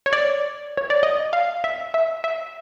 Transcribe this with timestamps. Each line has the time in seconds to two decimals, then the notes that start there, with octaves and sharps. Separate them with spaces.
0.06 C#5
0.13 D5
0.77 C#5
0.90 D5
1.03 D#5
1.33 F5
1.64 E5
1.94 E5
2.24 E5